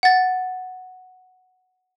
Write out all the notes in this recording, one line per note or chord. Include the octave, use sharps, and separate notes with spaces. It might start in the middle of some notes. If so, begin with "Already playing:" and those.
F#5 A6